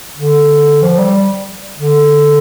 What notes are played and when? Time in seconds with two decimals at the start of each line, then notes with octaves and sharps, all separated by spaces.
0.17 D3
0.82 F3
0.98 G3
1.78 D3